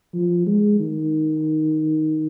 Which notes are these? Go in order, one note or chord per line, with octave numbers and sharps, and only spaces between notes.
F3
G#3
D#3